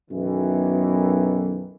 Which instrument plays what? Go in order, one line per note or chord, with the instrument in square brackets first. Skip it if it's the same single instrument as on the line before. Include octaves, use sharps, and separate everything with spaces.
[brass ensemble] B1 F#2 D#3 E3